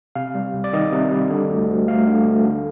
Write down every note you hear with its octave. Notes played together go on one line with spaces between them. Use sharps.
C3 F5
G3
C2
D5
D#3 D#5
C3
G3
D3
D2
D2
A3 F5
D3
D2
D3